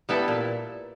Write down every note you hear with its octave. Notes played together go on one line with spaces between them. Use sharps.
G3 B3 E4 A4
A#2